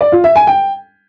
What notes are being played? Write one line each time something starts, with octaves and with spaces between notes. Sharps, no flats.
D5
F4
E5
G#5
G5